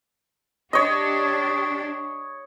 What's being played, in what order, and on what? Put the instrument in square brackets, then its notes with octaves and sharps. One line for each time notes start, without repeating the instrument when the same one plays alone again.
[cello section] D4 G4 [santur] C#5 D#5